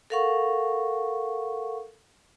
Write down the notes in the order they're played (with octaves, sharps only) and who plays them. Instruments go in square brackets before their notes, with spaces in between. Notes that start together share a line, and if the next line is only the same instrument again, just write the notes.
[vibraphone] A4 A#4 F5 F#5 C#6